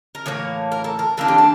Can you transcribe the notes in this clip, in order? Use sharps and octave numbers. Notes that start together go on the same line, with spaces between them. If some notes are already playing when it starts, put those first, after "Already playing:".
A#4
A2 E3 A#3 C#5
A#4
A4
A#4
E3 A#3 D4 A4
G4
A4